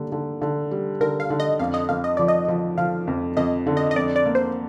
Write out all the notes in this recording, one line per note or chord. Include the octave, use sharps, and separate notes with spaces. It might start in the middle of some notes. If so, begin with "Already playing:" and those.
Already playing: D3 G3 A#3
D3
D3
G3
D3 A#4
F5
D3
D#5
F2 F5
D#5
F2 F5
D#5
F3 D5
D#5
F3
F3 F5
F2
F2 D#5
D3
D#5
D#5
F2 D5
D5
A#3
C5